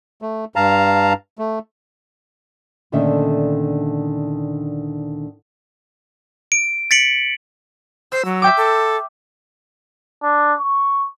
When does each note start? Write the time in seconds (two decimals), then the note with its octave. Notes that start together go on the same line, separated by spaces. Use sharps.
0.22 A3
0.56 G2 F5 A5 A#5
1.39 A3
2.92 D2 A#2 D3 D#3 C#4 E5
6.52 D7
6.91 A6 B6 C#7 D7 F#7
8.12 C5 E6
8.25 F#3
8.42 E5 G5 D6
8.57 A4
10.23 D4
10.59 C#6